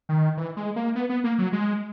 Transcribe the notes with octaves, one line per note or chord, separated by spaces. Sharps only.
D#3
E3
G#3
A#3
B3
B3
A#3
F#3
G#3